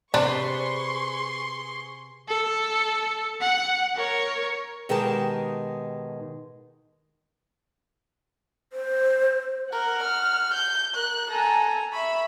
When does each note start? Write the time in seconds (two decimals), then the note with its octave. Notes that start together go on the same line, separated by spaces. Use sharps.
0.14 C3 D4 G#4 B4 C5 C6 C#6
2.28 A4
3.41 F#5
3.96 A#4 C#5
4.89 B2 D#3 G#3 G4 A#4 A5
8.73 C5
9.72 A#4 F#5
10.03 F6
10.54 G6
10.95 A#4 F#6
11.31 A4 G#5 A#5
11.92 E5 B5 C#6